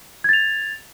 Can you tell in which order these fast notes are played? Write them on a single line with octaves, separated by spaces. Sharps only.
G#6 A6 F7